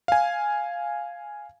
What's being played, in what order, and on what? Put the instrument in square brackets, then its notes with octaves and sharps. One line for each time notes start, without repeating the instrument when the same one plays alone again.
[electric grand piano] F5 G#5